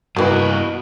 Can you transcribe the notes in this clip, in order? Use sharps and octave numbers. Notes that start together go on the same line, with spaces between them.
G2 B2 E3 A#3 E4 F#4